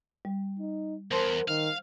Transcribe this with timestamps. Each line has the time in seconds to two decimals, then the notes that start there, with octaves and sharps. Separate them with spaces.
0.25 G3
0.59 D#4
1.11 E2 A#4 C5 A5 C6
1.48 D#3 F5